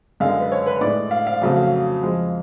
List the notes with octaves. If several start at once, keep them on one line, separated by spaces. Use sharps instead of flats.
F#2 D3 G#3 F5
B4
C#5
B4
A2 G#3 D5
F5
F5
F2 C#3 F#3 A3 F5
F5
F2 F3 G#3